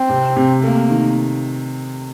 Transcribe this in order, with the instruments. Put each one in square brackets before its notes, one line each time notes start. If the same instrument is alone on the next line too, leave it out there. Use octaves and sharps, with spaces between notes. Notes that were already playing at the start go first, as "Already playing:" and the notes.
Already playing: [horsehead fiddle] C4
[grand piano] C3
C3
[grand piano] A3 [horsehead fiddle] A#3
[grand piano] D#3